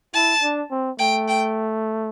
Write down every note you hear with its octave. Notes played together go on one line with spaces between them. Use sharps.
E4 A5
D4
C4
A3 G5
G5